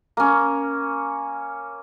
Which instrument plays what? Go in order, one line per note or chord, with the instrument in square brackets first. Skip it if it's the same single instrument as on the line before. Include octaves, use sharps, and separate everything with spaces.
[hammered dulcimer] A#3 C#4